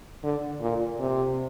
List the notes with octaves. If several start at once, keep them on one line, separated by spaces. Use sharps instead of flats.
D3
A#2
C3